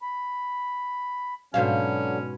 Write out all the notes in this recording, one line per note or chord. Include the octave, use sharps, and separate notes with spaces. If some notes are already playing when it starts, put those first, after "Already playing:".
B5
G#2 B2 D3 F#3 C#4 F5